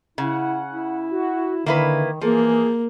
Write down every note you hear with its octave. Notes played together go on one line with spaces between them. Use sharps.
C#3 E4 F#5
E4
F#4
D3 D#3 A#3 E4 B4
E3 F3 A#3 G#4